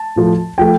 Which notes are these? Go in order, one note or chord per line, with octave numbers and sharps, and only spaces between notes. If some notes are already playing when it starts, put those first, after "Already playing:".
Already playing: A5
A2 F3 A3
F3 A3 G5